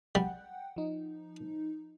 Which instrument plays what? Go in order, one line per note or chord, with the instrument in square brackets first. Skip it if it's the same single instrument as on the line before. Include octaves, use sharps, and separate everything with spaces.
[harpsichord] G3 [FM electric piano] F#5 G5
[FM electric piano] F3 D#4